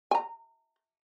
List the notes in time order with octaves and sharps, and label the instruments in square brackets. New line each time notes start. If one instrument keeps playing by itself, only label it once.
[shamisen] G#5 A#5